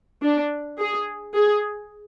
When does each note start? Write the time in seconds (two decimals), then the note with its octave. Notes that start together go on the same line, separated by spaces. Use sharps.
0.23 D4
0.79 G#4
1.35 G#4